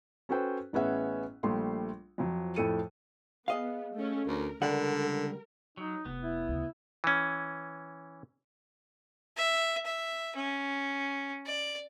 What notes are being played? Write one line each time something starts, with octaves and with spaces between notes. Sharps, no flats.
C#4 F#4 A4 B4 C5 G5
A1 B3 C#4 G#4 E5 F#5
A#1 G3 A3 C6
F2 F3 F#3
F2 A2 A3 A4 C#7 D#7
B3 G#4 D#5 F5
A3 C#4
D2 A#4
C#2 D3 G3 A#4 F#5
F#3 D#4
F1 B3
E4
D2 C#3
E3 C#4
E5
E5
C#4
D5